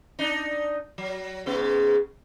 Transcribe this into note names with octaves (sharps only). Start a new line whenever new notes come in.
D4 D#4
F#3
G#2 C#3 B3